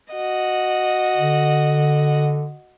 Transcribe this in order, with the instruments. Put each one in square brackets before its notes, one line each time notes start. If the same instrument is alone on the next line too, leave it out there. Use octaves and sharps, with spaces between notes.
[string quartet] F#4 D#5
[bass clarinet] D3